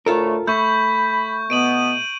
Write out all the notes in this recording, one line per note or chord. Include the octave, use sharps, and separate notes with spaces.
D2 A2 A3 F4 A4 A#4
A3 B5 C#6 G6
B2 B3 D7 D#7 F#7